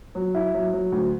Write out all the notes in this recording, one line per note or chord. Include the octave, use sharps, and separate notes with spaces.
F#3
E4
F#3
F#3
D2